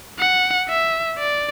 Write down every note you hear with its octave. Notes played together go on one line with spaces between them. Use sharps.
F#5
E5
D5